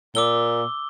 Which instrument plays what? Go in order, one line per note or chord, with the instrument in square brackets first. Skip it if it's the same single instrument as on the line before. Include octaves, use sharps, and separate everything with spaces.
[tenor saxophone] A#2 [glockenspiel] D6 E6 G7